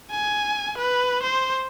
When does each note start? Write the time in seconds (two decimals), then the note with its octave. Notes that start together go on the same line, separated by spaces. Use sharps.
0.11 G#5
0.78 B4
1.23 C5